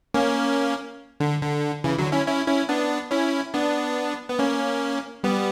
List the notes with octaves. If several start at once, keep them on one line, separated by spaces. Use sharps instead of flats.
A#3 C#4
D3
D3
C#3 E3
D3 F#3
C#4 E4
C#4 E4
C#4 E4
B3 D4
C#4 E4
B3 D4
B3
A#3 C#4
G3 B3